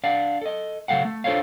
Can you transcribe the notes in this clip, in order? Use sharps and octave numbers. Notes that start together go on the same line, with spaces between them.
D4 D5 F5 F#5
A4 D#5
C#3 F#3 A3 F5 F#5
A3
D4 F4 A4 C5 C#5 F5